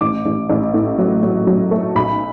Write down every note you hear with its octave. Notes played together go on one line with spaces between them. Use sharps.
A1 D6
A1
A1
A2
F#3
F#3
F#3
A3
B1 B5